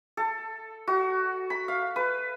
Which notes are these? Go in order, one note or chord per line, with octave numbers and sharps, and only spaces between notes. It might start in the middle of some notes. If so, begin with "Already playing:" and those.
A4
F#4
B5
F5
B4